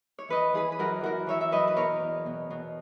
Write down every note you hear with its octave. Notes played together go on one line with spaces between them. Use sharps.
C#5
E3 B4 D#5
E3 G#4 B4
B4
F#2 F#4 A#4
E3 F#4 A#4
E3 C#5 E5
E5
F#2 B4 D#5
B4
B2 A#4 C#5
E2
B2
B2